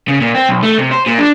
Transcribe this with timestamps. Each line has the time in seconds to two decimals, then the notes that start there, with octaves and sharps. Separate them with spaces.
0.08 C#3
0.21 A#2
0.35 C4
0.49 B1
0.63 A3
0.78 C3
0.91 C5
1.06 A#2
1.18 D4